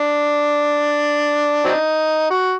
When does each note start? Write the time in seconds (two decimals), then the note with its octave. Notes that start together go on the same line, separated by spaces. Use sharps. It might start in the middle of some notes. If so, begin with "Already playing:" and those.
Already playing: D4
1.64 F#3 C4 D#4
2.30 F#4